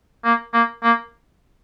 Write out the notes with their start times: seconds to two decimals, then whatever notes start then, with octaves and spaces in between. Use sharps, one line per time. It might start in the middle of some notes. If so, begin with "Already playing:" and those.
0.25 A#3
0.54 A#3
0.83 A#3